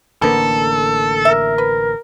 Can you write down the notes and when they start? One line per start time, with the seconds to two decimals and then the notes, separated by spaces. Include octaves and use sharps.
0.22 A1 D3 A#3 B3 A4 A#4
1.25 A#4 E5
1.58 B4